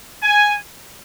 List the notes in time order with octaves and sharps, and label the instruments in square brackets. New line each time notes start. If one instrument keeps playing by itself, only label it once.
[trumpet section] G#5